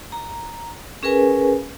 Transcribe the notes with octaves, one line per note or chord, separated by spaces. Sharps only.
A#5
C#4 G#4 A#4 B4 G#5